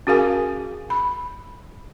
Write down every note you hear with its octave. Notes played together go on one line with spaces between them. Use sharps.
C#4 F#4 G#4 A#4 F5 G#5
B5